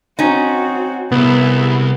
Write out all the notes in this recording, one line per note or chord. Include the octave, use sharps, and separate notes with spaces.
C4 C#4 D#4 F#4
C2 B3 G#4 E5